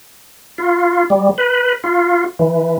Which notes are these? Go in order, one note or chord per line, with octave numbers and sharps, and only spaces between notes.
F4
G3
B4
F4
E3